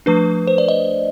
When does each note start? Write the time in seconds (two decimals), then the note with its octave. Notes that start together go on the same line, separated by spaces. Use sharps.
0.06 F3 A3 D4 B4
0.47 C5
0.58 D5
0.68 D#5